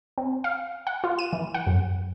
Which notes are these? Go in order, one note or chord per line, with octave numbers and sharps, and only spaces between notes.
C4
F5
F#5
F4
D#7
E3
F#5
F#2